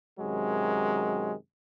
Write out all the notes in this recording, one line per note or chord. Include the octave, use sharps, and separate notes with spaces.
F#2 C3 D#3 F#3 G#3